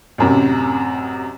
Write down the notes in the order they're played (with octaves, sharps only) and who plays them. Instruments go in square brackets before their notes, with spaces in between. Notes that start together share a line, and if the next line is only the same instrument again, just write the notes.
[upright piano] A1 F#2 C3